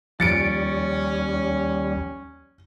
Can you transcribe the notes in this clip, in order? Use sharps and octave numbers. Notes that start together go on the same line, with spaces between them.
D#2 F3 G3 C#4 A6 C#7 D7